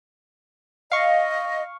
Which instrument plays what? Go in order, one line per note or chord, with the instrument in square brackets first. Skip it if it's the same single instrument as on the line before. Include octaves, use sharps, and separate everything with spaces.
[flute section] D#5 [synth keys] F5 C#6